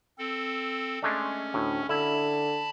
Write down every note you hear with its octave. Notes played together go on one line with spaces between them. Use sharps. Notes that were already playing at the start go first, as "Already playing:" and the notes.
C4 A4
G#3 A3 C#4 D4
D2 A2
D3 E4 A5 B5